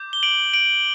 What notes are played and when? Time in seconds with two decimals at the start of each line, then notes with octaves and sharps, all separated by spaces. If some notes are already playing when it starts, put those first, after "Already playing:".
Already playing: D6 G6
0.13 G7
0.23 D7 F#7
0.53 D7 F#7